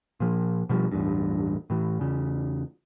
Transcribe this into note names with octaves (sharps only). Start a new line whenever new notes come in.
A#2 F3
B2 F3 G3
A1 E2 G2
A2 E3
E2 C#3